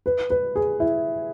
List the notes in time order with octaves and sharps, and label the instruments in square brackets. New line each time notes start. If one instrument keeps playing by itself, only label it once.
[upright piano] B4
B4
G#4
E4